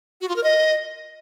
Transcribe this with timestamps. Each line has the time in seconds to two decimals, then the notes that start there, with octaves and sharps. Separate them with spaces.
0.21 F#4
0.29 F4
0.36 A#4
0.44 D#5